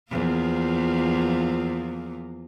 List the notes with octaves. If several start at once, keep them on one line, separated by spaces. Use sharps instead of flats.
E2 F3 A#3